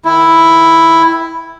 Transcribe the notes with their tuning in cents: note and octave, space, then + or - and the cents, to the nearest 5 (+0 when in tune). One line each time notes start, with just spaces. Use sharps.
D#3 +0 E4 +0